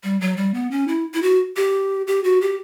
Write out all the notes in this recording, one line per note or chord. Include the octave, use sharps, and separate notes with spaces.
G3
F#3
G3
B3
C#4
E4
E4
F#4
G4
G4
F#4
G4